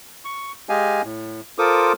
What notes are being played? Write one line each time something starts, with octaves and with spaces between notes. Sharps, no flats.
C#6
G#3 G4 D#5 F5 G#5
A2
F4 A4 A#4 C5 D6 D#6